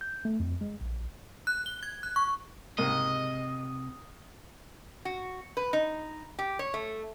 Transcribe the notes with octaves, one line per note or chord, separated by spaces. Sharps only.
G6
A3
F2
G#3
A#1
F#6
G7
G#6
F#6
C#6
C#2 G#2 C3 A#3 D#5
F#4
B4
D#4
G4
C#5
A3